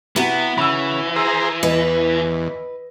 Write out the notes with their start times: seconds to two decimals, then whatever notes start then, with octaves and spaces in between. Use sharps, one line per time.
0.16 C3 B3 E4 F#4
0.58 C#3 E3 B5 E6
1.16 G#4 C5 A#5 E6
1.63 E2 B4 D#5